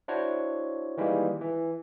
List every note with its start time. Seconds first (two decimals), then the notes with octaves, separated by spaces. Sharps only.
0.08 D4 E4 F#4 C5 C#5
0.97 D#3 E3 G3 G#3 A#3
1.41 E3